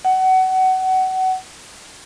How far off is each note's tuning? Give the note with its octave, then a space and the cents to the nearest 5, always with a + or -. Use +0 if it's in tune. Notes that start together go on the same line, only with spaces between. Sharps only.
F#5 +25